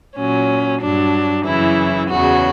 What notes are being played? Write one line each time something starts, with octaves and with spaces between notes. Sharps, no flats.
A#2 F#3 C#4
G2 F#3 D4
F#2 C#3 E3 E4
E2 C#3 F#3 F#4